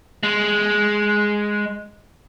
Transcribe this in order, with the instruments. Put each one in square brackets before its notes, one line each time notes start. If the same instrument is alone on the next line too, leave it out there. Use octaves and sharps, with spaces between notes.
[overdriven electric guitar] G#3